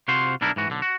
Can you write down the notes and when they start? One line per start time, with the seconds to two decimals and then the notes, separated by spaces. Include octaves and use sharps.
0.08 C3 F4 F#4 C5 C6
0.41 B1 G3 D4 E4 A#4
0.56 G#2 E3 F#4
0.68 B1 D3
0.82 F#4